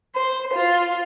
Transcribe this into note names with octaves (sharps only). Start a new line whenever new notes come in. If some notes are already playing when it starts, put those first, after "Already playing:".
C5
F4